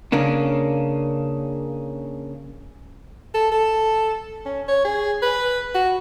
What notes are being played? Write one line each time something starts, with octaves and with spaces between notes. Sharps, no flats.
C#3 A#3 C#4 D4
A4
A4
C#4
C#5
G#4
B4
F#4